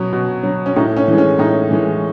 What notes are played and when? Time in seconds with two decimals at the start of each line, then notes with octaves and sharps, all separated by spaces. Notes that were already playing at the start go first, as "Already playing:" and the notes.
Already playing: B2 F#3 C#4
0.13 B2
0.43 F#3
0.66 C#4
0.76 A2 D#4
0.97 C#4
1.08 E3 G#3
1.18 C#4
1.39 A2 D#4
1.71 E3 G#3